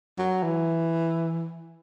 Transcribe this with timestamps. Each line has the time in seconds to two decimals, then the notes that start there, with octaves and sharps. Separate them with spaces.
0.18 F#3
0.43 E3